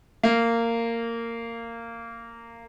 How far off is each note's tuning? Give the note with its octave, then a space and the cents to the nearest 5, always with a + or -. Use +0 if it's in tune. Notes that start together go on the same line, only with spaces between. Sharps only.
A#3 -15